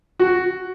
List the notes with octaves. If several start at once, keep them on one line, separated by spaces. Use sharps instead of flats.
F#4